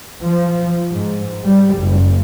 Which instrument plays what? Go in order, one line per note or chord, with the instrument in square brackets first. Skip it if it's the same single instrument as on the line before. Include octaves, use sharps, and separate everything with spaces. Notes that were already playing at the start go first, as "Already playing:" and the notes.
[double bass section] F3
G#2
G3
F#1